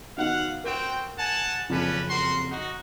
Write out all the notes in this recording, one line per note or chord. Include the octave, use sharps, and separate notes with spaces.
D#3 B3 F#4 F5 F#5
C4 F#4 A#4 G5 E7
F#5 G#5 A5
F#1 F2 F3 C#4 D4 B4
F#4 A#4 C6
D#4 F#4